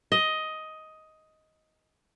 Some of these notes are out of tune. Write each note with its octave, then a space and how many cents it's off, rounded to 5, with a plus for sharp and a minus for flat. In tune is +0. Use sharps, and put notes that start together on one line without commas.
D#5 +10